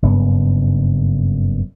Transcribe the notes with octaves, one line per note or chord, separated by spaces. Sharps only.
F#1 G2 C#3 B3